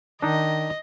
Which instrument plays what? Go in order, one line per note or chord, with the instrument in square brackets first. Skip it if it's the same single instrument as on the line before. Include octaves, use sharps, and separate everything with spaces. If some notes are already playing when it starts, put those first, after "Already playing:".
[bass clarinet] D#3 [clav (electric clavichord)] D4 D#4 [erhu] D#5